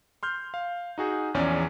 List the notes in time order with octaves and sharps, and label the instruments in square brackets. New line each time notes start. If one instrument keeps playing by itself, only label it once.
[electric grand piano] C6 F6 G6
F5
D#4 F#4 G#4
A#1 E2 C#4 D5